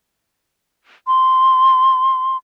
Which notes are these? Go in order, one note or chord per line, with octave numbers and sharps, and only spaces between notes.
C6